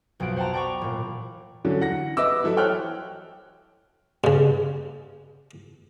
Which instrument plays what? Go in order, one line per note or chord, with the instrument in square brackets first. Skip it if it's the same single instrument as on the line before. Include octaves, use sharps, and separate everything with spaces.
[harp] B1 F2 B2 F#5 D7
C5 F#5 G5 A5 A#5
D5 G5 A#5 B5 C#6 D6
E1 A#2
[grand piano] D3 E3 F#3 C#4
F#5 A#6
B4 D#5 E5 D6 E6
E3 F#3 E4 A4
A4 C5 C#5 G5 F6 F#6
[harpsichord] G2 C#3